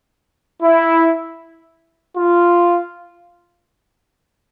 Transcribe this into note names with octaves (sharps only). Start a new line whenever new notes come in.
E4
F4